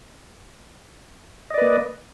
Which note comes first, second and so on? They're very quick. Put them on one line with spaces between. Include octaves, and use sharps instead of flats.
D#5 D5 B4 A#3